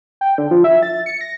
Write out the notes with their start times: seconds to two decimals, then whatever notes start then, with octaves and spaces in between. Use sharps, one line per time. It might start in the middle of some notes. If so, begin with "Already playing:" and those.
0.21 G5
0.38 D3
0.51 F3
0.64 E5
0.82 A6
1.06 C#7
1.21 A#6